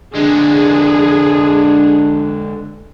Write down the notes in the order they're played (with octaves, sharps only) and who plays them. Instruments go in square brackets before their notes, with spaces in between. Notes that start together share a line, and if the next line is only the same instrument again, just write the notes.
[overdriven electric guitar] D3 G#3 [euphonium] D4 [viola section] G#4